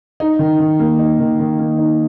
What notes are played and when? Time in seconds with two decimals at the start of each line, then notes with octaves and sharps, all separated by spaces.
0.20 D#4
0.39 D#3
0.60 D#3
0.79 A#3
0.99 D#4
1.19 D#3
1.39 D#3
1.59 A#3
1.78 D#4